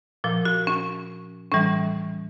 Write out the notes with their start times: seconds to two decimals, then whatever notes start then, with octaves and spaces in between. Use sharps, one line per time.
0.24 A#2 F3
0.45 F#4
0.67 C#4
1.52 A2 E3 G3 C#4